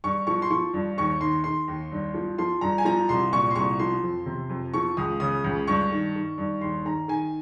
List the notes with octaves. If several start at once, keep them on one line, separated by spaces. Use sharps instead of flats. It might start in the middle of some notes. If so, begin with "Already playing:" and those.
G2 C#6
F3 C#6
C6
F3 C#6
G2
D#2 C#6
D#3 C6
D#3 C6
D#2
G2
F3
F3 C6
G2 A#5
G#5
F3 A#5
C2 C6
A#2 C#6
C6
C2 C#6
F3 C6
F2
C3
F2
F3 C#6
C#2 D#6
C#3 D#6
C#2
G2 C#6
D#3
D#3
G2
D#2 C6
D#3 A#5
D#3 G#5